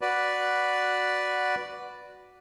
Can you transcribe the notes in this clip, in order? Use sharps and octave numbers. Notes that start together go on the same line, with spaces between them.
F#4 B4 D5